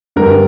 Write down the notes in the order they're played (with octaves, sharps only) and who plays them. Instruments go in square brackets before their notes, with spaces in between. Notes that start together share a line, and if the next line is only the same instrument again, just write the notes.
[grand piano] G2 D3 G3 A#4